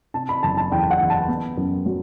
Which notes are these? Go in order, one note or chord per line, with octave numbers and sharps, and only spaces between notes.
C3 A5
B5
F#1 A5
A5
E2 G5
F#5
E3
A5
B3
F#2
F#3